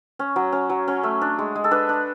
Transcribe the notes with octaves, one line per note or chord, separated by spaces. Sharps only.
C#4
F#3
C#4
F#3
C#4
A3
D4
G#3
G#3
A4
D4 B4
D4